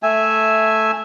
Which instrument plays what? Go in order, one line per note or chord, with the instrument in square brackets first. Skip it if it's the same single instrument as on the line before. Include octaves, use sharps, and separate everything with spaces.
[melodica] A3 E5 G#5